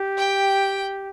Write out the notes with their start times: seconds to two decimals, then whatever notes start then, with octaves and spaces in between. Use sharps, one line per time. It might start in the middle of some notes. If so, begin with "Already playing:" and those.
Already playing: G4
0.17 G5